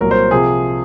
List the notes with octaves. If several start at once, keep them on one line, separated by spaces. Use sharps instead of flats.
C2 A#2 F#3 A#4
C5
C3 F3 G#4